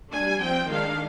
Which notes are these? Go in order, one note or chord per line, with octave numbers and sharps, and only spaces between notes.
G3 D4 G#5
F3 C4 G5
D#3 G#3 D4 F5